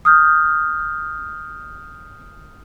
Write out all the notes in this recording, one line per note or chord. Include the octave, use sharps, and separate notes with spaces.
D#6 F6 G6